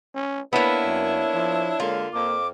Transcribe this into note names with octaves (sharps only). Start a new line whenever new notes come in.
C#4
A#3 B3 D4 E4 B4 C#5
F#2
F3
D3 G#3 A#3 F4
F2 A#3 D6